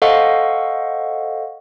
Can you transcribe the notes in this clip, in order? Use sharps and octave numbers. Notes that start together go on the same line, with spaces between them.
A4 C5 D#5 F5 F#5 C#6